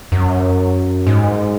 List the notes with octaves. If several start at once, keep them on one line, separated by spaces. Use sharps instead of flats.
F#2
G#2